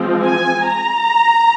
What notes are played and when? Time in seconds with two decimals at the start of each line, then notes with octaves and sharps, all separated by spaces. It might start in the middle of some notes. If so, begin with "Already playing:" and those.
Already playing: F3 G#3 C4
0.22 G#5
0.65 A#5